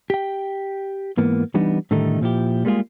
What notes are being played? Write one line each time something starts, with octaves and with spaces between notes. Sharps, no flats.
G4 G5
G#2 E3 A#3 B3
E3 G3 B3 D4 D#4
A2 D3 D#3 G3 A3 D#4
A#2 F3 E4 G4
G3 G#3 A#3 B3 F4 G#4